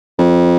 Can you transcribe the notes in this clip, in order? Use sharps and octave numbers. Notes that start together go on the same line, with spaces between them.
F2